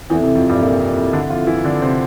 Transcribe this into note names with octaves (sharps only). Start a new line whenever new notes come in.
E2 E3 C4 E4 A4 E5
C3
F2 F3
G2 G3
A#2 A#3
D3 D4
F3 F4
E3 E4
D3 D4
C3 C4